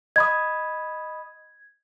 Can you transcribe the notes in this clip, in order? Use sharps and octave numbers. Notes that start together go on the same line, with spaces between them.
D#5 B5 D#6 G#6